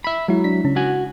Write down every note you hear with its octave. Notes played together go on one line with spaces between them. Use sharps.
E5 B5
F#3 G#3 E4
D4 B6
C#3 C#4
F#4 G#5